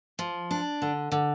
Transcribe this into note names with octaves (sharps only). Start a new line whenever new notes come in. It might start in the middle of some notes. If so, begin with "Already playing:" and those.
F3
D4
D3
D3